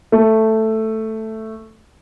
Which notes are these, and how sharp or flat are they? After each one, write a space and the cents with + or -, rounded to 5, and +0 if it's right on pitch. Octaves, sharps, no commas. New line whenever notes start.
A3 +5